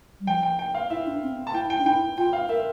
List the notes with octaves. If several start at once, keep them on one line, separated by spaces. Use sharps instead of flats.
G3
F3 G5
G5
G5
F5
E4 E5
D4
C4
A5
E4 G5
G5
D4
E4 G5
F4 G5
F5
A#4 E5